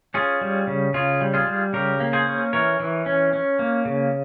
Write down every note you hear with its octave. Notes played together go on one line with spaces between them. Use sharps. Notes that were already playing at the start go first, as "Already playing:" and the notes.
C#4 F4 G#4
G3
C#3
C#3 F4 G#4
G3
F4 G#4
G3
C#3 G4 A#4
A#3
G#4 C5
C#4
E3 A#4 C#5
E3
C#4
C#4
A#3
C#3